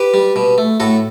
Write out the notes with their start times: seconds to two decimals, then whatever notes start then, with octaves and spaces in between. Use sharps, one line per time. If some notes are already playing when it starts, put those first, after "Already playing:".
Already playing: G4 B4
0.14 G3
0.36 B2
0.58 A3
0.80 A2 F#4 A4